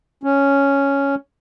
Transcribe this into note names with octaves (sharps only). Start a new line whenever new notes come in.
C#4